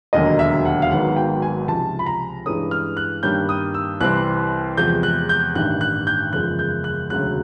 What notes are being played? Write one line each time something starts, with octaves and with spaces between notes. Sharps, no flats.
E1 D#2 D3 F#3 A#3 D#5
E5
F#5
F5
G#1 G#2 D#3 F#3 B3 F#5
G5
G#5
C#2 C3 F3 A5
B5
A#5
G2 E3 G#3 C#4 D#6
F6
F#6
G2 D#3 G3 A#3 C#4 G6
D#6
E6
C2 C3 E3 G3 C4 F#6
E2 C3 F3 G#3 G6
F#6
G6
A1 G2 D#3 F#6
F#6
G6
F#1 E2 C#3 F3 G#3 F#6
G6
F#6
E1 D2 C#3 F#3 F#6